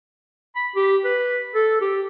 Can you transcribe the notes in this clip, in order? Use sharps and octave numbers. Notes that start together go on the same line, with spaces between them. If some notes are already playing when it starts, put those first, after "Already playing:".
B5
G4
B4
A4
G4